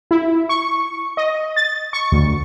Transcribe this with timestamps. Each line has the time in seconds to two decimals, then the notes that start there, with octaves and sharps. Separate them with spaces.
0.11 E4
0.49 C#6
1.17 D#5
1.56 A6
1.93 C#6
2.12 D2